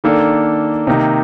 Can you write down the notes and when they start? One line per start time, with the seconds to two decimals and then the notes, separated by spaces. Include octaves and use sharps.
0.04 D#3 A#3 D4 A4
0.87 C3 D#3 A#3 D#4